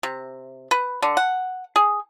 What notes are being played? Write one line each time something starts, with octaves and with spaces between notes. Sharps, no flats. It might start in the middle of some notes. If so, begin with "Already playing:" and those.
C3
B4
D3
F#5
G#4